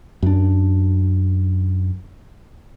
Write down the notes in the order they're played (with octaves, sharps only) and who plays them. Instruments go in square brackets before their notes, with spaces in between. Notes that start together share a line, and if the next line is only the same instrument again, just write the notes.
[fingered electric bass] F#2 D4